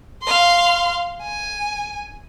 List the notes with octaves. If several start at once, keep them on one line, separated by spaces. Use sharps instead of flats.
F5 C6
G#5